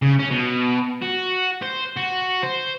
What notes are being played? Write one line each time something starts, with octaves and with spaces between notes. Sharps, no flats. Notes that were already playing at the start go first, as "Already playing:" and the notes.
C#3
C#4
B2
F#4
C5
F#4
C5